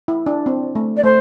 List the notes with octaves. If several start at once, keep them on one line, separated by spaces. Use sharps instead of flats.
E4
D4
C4
A3
D5
A3 C5